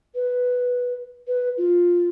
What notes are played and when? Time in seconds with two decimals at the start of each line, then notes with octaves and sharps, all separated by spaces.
0.15 B4
1.27 B4
1.58 F4